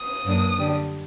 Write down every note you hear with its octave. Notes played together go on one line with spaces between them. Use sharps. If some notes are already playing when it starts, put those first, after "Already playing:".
Already playing: D#6
F#2 F#3 A#3 D4
D3 G3 D4